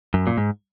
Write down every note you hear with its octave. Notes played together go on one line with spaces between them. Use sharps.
F#2
A#2
G#2